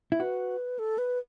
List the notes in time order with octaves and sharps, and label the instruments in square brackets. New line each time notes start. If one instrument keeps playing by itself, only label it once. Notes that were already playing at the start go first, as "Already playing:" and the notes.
[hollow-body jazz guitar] E4
[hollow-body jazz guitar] F#4 [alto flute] B4
[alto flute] A4
B4